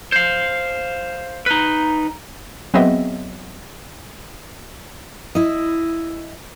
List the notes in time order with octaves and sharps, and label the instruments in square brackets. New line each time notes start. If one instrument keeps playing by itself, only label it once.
[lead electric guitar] C5 F5
D#4 B4
[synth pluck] F#3 B3 C4 G#4 D#5 E5
[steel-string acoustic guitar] E4 D#5